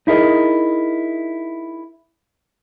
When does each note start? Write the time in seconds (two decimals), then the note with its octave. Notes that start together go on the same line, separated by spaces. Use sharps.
0.07 D#4 E4 G#4 A#4 D#5